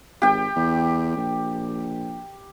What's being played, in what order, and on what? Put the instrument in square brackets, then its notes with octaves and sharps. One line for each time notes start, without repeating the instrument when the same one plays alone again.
[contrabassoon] G#1 [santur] G4 G5
[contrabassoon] E2
A#1